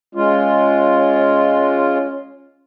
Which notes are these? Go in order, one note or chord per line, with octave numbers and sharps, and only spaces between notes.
G#3 C#4 F4